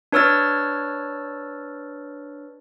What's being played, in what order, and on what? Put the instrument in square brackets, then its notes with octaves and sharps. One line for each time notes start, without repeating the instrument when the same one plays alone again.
[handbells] D4 B4 C#5 E6 F6 A6